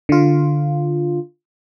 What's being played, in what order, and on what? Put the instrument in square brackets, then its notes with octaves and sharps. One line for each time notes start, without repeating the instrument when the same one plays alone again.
[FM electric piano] D3 F4